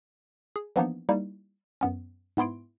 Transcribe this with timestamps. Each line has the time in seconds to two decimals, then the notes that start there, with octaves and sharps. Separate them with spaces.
0.56 G#4
0.76 E3 F3 A#3 B3 D4 D#4
1.09 G3 A#3 D#4 E4
1.81 F#2 B3 C#4
2.37 G#2 B3 E4 C6 D7